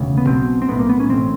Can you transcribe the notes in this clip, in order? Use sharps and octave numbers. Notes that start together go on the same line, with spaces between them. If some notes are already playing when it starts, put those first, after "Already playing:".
Already playing: E1 D2 C#3
B3
B1 B2 C4
C4
B1 A2 B3
A#3
B3
C#4
A1 A2 C4